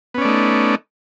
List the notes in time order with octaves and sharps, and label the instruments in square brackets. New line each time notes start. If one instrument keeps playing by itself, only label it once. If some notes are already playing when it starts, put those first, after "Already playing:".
[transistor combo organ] B3
C#4
D5
A3
D#4